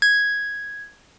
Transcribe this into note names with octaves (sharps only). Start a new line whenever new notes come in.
G#6